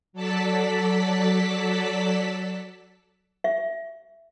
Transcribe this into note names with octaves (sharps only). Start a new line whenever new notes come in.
F#3 A4 D5 A5 B6
E5